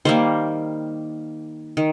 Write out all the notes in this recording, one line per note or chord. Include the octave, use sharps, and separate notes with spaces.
D#3 G3 A#3 C5
D#3